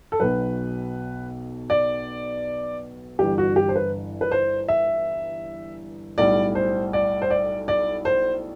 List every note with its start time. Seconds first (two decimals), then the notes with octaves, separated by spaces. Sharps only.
0.12 A4
0.20 B1 B2 F#3 B4
1.70 D5
3.19 G1 G2 E3 G4
3.38 F#4
3.56 G4
3.69 C5
3.76 B4
4.21 B4
4.31 C5
4.68 E5
6.18 B1 A2 G3 D5
6.55 C5
6.93 D5
7.22 C5
7.30 D5
7.68 D5
8.05 C5